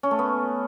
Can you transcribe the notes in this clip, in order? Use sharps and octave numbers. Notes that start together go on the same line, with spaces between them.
C#4
A3
B3